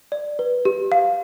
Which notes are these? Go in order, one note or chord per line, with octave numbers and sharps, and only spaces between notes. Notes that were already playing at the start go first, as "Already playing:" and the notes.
D5
B4
G4
F5